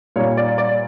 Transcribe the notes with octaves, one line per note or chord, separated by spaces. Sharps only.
A#2 G3 A#3 C#5
D5
D5